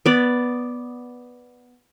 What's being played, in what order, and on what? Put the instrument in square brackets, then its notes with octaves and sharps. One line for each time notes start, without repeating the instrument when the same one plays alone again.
[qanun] B3 D5